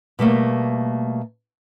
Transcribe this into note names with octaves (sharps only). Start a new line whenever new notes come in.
B2 G3 A3 A#3